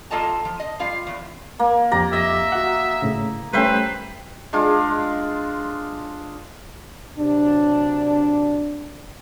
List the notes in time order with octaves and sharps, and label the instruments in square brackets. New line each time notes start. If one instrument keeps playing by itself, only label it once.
[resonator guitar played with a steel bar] A#3 F4 A4 D#5 A5 A#5
F3
D#5
G3 F4 F5
E2
[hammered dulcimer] A#3
[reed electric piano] F2 G4 [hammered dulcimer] D5 A#5
[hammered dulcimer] D#5 [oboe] E5
[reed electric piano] F#4 F#5
A2 C#3
[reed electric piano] G3 A3 C#4 [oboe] B4 [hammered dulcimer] C5 E5 G5
[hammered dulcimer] G#3 D4 F4
[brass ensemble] C3 F#3 D4